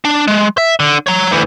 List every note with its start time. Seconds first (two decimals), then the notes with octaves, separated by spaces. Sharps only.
0.05 D4
0.27 G#3
0.58 E5
0.80 D3
1.07 C#5 A#5
1.31 D2 E3